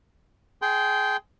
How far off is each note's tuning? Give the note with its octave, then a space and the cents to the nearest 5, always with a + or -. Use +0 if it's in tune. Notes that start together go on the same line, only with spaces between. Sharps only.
G#4 +20 G5 -10 C6 -15